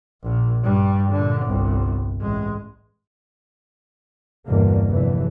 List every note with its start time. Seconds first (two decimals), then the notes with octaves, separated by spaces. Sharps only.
0.23 A#1 A#2
0.63 G2 G3
1.11 A#2 D3
1.46 G1 C2
2.21 A1 G#3
4.46 G1 E2 G2 B2 D3 A#3
4.87 F1 F2 D3 E3